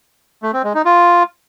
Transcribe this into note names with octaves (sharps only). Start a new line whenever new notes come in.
A3
C4
G#3
D#4
F4